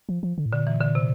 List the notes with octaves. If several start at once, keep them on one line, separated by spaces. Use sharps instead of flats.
F3
F3
D3
A2
A#2 D3
E3
D3
C3